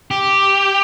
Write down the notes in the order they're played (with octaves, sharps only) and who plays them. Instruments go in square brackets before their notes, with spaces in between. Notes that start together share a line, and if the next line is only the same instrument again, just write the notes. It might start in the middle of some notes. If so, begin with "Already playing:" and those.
[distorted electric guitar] G4